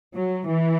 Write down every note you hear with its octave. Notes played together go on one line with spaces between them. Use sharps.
F#3
E3